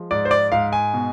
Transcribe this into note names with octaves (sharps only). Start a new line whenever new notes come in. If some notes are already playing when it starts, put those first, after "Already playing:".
Already playing: F3 G#3
G#2 D5
C5
D5
G#2 F5
G#5
B2